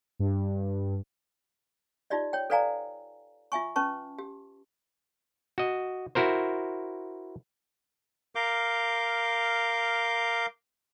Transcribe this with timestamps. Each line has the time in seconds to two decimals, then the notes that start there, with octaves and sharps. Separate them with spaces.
0.20 G2
2.10 D#4 F4 G4 D5 D#5
2.33 C#5 G5
2.50 A4 B4 D5 F5 G#5 A#5
3.52 F4 E5 G#5 C#6
3.76 C#4 B4 A5 C#6
4.18 G4
5.58 F#4 D#5
6.15 E4 F#4 A#4 C5
8.35 A#4 F5 D6 G6